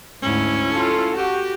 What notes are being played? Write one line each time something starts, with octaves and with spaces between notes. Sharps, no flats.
D2 G#2 C#4 E4
F4 A4
F#4 G4